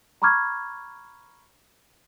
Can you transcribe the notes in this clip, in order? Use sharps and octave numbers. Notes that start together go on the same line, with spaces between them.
A#5 B5 C#6 D6 F6 G#6